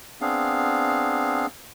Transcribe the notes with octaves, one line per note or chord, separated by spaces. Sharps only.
B3 C4 D4 G#4 F5